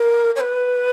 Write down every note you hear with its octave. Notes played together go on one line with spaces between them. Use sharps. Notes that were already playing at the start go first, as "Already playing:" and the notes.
Already playing: A#4
C#5
B4